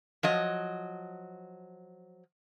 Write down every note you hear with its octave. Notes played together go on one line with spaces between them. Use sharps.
F3 F#3 D#5